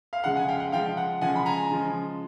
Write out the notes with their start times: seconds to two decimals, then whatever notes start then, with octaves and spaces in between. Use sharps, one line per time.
0.13 F5
0.24 C#3 F3 G#3 F#5
0.36 F#5 G#5
0.48 F5 G5
0.60 F#5
0.72 C#3 F3 G#3 F5 G5
0.97 F#5
1.21 C#3 F3 G#3 F#5 G#5
1.35 B5
1.46 G#5 A#5
1.71 C#3 F3 G#3